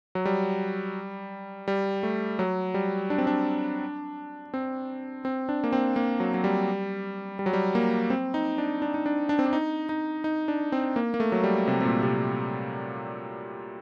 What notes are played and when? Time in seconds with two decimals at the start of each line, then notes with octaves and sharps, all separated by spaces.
0.15 F#3
0.25 G3
1.68 G3
2.03 A3
2.39 F#3
2.74 G3
3.10 D4
3.18 C4
3.27 D4
4.54 C4
5.25 C4
5.49 D4
5.64 A#3
5.73 C4
5.96 A#3
6.20 F#3
6.34 F#3
6.44 G3
7.39 G3
7.46 F#3
7.53 G3
7.75 A#3
8.10 C4
8.34 D#4
8.58 D4
8.82 D4
8.94 D#4
9.06 D4
9.29 D4
9.39 C4
9.46 D4
9.53 D#4
9.89 D#4
10.24 D#4
10.48 D4
10.72 C4
10.96 A#3
11.14 A#3
11.20 A3
11.32 F#3
11.44 G3
11.68 C3
11.81 C3
11.85 A#2
12.03 C3